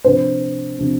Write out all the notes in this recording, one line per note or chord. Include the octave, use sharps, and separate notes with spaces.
C3 F3 D4 C5
C3 F3 D4